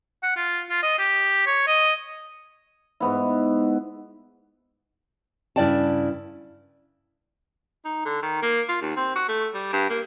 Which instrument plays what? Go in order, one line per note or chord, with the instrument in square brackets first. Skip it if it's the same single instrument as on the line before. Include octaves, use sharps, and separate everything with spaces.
[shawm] F#5
F4
F4
D#5
G4
C#5
D#5
[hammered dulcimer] G#2 B3 E4
[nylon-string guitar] G2 C#3 E4 D5 G5 A5
[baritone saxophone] D#4
D3
D#3
A#3
F4
D#2
C4
F#4
A3
G3
G2
A#3